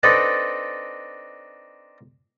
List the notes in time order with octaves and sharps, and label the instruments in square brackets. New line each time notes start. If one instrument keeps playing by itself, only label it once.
[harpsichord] C4 D4 D#4 A4 B4